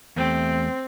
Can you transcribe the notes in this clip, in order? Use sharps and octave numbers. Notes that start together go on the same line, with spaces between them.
E2 A3 C4 G4